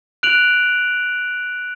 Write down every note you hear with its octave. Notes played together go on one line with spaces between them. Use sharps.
F#6 D7 F7 F#7